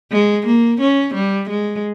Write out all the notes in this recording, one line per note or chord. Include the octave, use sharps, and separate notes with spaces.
G#3
A#3
C#4
G3
G#3